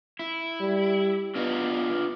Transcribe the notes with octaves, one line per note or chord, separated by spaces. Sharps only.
E4
G3
B3 D4 F4 D#5